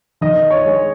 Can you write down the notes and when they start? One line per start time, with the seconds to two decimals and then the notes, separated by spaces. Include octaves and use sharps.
0.21 D#3 D#5
0.50 C#5
0.65 G#3